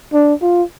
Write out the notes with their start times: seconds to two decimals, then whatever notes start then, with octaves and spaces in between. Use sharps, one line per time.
0.13 D4
0.42 F4